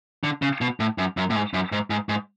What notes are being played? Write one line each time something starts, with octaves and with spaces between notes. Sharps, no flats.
D3
C#3
B2
A2
F#2
F#2
A2
G#2
F#2
G#2
G#2
G#2